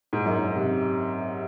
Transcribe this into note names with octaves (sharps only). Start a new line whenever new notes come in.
G#2
F#2
G#2
C3